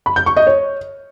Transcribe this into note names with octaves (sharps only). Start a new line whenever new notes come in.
B5
G6
C#6
D#5
C#5